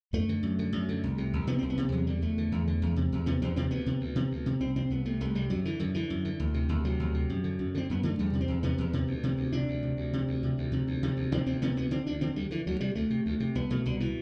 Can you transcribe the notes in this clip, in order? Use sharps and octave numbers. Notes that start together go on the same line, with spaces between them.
F#2 A3
D3
F#2
D3
F#2
D3
C2
C3
C2
C3 B3
C2 C4
B3
C3
E2 F#3
D3 G3
E2 A3
D3
E2
D3
E2
C3
E2
C3 B3
E2 C4
C3 C4
D2 B3
C3
D2
C3
D2
C3
C2 C4
C3 C4
C2 B3
C3 A3
C2 A3
C3 G3
F#2 F#3
D3 E3
F#2 D3
D3 E3
F#2
D3
D2
C3
D2
C3 F#3
D2
C3
F#2
D3
F#2
D3 C4
F#2 B3
D3 A3
E2 G3
C3
C4
E2
C3 B3
E2
C3
D2
C3
D2
C3 D4
D2
C3
D2
C3
D2
C3
D2
C3
D2
C3
D2
C3 C4
D2 C4
C3 B3
D2 B3
D3 C4
D2 D4
D3 C4
D2 G3
D3 E3
D2 F#3
C3 G3
D2 A3
C3
D2
C3
C2 B3
B2 A3
C2 D3
B2 E3